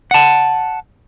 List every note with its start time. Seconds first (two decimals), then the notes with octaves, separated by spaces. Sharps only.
0.11 F#5 A5